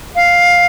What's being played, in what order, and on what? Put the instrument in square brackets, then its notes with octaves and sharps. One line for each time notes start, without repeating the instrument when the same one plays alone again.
[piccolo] F5